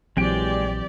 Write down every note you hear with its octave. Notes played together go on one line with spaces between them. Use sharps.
A#1 E3 F#3 G#3 C4 G4 D5 G5